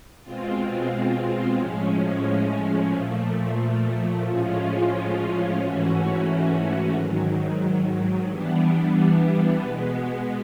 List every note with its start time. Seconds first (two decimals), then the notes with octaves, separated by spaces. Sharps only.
0.23 B2 G#3 C4 F4
1.57 A2 F3 G#3 C#4
2.91 A#2 F3 A3
4.25 A2 F3 G#3 C#4 F4
5.59 G#2 E3 A3 C#4 F#4
6.93 G#2 D#3 F#3
8.27 E3 G3 B3 D4
9.61 B2 G#3 B3